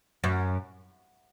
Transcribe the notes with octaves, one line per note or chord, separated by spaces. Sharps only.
F#2